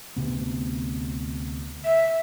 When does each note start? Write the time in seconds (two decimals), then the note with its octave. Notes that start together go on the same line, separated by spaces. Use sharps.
0.17 D2 C3 B3
1.85 E5